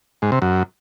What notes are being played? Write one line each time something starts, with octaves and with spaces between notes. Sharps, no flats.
G#2
C3
F#2